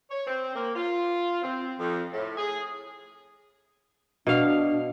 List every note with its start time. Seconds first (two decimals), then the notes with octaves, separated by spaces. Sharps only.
0.11 C#5
0.27 C4
0.55 A#3
0.75 F4
1.42 C4
1.79 F2
2.13 A2
2.37 G#4
4.27 B2 D4 F5